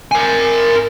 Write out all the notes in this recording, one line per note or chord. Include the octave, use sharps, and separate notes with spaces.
A#4 G#5